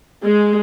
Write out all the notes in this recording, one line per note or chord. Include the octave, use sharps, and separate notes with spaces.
G#3